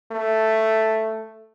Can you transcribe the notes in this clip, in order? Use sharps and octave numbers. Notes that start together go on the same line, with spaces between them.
A3